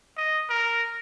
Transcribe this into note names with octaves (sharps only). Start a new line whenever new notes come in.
D#5
A#4